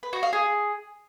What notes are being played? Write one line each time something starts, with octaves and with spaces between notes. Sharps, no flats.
B4
F#4
F5
G#4